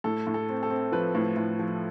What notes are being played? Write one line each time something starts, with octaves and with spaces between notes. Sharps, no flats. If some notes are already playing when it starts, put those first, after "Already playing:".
A2 A4
A2
A4
C4
A4
C4
F3 B4
A2
A2
F3